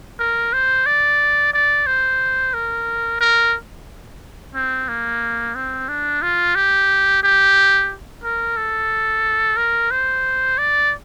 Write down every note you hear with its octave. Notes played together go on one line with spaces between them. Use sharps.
A#4
C5
D5
D5
C5
A#4
A#4
C4
A#3
C4
D4
F4
G4
G4
A#4
A4
A#4
C5
D5